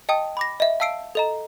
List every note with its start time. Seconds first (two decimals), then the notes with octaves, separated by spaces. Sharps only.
0.09 D#5 G5 A5 D#6
0.37 B5 D6 A#6
0.60 D#5 E5
0.80 F5 A5 E6 C7 D7
1.15 A4 D#5 A#5